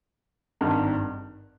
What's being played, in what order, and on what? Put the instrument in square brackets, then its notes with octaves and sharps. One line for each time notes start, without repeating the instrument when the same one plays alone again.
[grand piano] G#1 G2 D#3